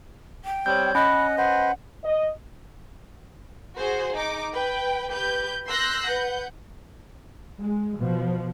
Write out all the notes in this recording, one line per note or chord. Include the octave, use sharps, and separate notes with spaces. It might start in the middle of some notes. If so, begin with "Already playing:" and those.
G5
G3 C4 C#5 G6
C#4 D#5 F#5 B5
B4 C5 F#5
D#5
F#4 G#4 C5
D#4 D6
B4 G5
G4 B4 G6
C6 E6 F#6 G6 A#6 C7
B4 F#5 G6
G#3
B2 F3